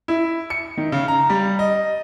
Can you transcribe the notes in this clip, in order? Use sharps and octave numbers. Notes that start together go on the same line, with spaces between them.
E4
C#7
D#3
C#3
A#5
G3
D#5